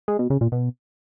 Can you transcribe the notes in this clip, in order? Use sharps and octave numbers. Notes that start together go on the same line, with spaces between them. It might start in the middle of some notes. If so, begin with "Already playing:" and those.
G#3
B2
C#3
A#2
B2